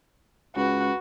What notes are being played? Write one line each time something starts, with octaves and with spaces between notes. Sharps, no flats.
C#2 F#4 B4